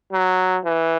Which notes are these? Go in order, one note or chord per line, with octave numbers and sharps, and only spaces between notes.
F#3
E3